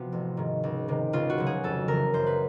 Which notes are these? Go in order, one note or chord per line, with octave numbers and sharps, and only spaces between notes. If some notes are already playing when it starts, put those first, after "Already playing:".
Already playing: C3 F3 B3 F#4
A1
G#2 D#3
C#2
C3 D#3
C#2 F4
F#4
C#3 F#3
G#4
F2 A4
C#3 E3 A#4
F#2 C5
B4